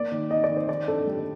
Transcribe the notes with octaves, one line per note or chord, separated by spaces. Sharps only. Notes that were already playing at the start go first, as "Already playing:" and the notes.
Already playing: A#3 D5
D#3
D#4 D#5
D5
D#3
C5
D#3 D5
G2 A4
G3